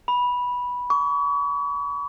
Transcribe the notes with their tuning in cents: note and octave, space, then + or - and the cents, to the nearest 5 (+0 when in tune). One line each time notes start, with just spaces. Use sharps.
B5 -10
C#6 +40